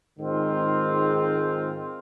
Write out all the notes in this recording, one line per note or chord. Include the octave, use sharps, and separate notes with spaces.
G#2 D#3 G#3 C4 F4